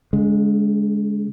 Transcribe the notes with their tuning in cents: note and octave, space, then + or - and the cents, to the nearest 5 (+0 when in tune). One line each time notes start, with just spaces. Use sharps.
D3 -45 G#3 +0